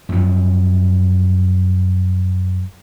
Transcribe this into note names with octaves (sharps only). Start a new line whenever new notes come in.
F#2 F3